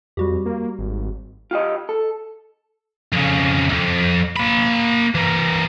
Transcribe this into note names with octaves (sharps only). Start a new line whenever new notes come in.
F2 G3 F#4 G4
A#3
G#1
F4 G4 D#5
A4
F2 C#3
C2 F2
A#3 B5
E3 A#3